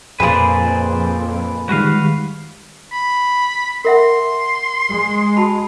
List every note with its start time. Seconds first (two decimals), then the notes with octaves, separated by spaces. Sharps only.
0.20 F2 A#2 G#4 B4 C5 D5
1.69 D#3 G3 G#3 F#4 B4 F5
2.92 B5
3.85 A#4 E5 F#5 C6
4.90 G#3
5.37 F#4 A5 B5